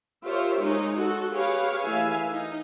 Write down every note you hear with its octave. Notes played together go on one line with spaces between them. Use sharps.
F4 G4 A#4 C5 C#5 E5
G#3 D#4 C#5
F#4 A4
G4 G#4 B4 C#5 F5
E3 A3 E5 F5 G#5
D#4